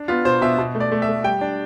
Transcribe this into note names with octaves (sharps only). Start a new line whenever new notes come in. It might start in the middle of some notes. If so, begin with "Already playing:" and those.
Already playing: D4
B3 F4
B2 C5
B2 E5
B2
A3
D5
A3
E5
A3
G3 G5
D4